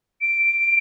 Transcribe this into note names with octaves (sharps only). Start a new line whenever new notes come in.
D7